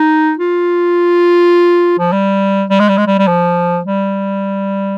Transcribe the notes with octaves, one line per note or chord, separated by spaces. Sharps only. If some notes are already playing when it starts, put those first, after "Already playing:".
Already playing: D#4
F4
F3
G3
G3
G#3
G3
G#3
G3
G3
F3
G3